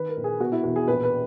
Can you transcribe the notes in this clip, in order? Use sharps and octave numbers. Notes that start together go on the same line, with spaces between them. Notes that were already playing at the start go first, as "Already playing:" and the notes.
Already playing: D#3 B4
A#4
A#1
G#4
B2 F#4
E4
E1 F#4
G#4
A#1 B4
B4